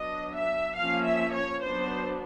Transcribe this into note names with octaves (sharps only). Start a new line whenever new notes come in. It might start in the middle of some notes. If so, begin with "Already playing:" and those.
Already playing: F#3 B3 D4 D#5
E5
F3 A#3 C#4 F5
E5
C#5
F#3 B3 D4 C5